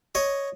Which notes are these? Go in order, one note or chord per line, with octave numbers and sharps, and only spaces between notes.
C#5 D#5